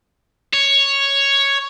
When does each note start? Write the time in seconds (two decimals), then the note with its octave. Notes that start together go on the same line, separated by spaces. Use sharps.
0.53 C#5